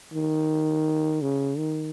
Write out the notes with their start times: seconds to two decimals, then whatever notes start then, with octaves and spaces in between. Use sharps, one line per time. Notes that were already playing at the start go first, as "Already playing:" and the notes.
0.14 D#3
1.22 C#3
1.58 D#3